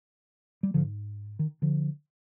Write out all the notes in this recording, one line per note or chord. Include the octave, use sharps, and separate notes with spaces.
G3
G#2 D3 F3
D#3
D3 F3